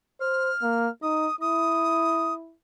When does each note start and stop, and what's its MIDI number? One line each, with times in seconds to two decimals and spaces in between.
0.21 0.51 72
0.21 0.90 89
0.63 0.89 58
1.02 1.28 63
1.02 1.36 87
1.41 2.55 64
1.41 2.34 87